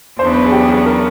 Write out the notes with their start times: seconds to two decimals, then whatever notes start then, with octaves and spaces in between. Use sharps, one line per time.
0.19 E2 C#3 F#3 B3 D4 C5
0.35 B4
0.45 G#4
0.52 G4
0.69 G#4
0.86 A#4